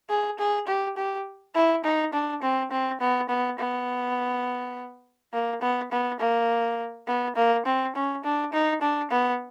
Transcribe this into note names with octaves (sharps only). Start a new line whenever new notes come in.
G#4
G#4
G4
G4
E4
D#4
D4
C4
C4
B3
B3
B3
A#3
B3
B3
A#3
B3
A#3
C4
C#4
D4
D#4
D4
B3